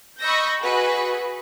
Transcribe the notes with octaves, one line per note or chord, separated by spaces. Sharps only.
D#5 B5 C#6 E6 G6 A#6
F#4 G#4 B4 D#5